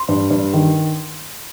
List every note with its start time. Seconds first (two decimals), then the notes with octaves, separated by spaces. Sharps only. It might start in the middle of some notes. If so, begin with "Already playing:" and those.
Already playing: C6
0.08 G2
0.31 G2
0.53 D#3